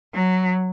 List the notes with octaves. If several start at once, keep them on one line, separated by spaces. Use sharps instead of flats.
F#3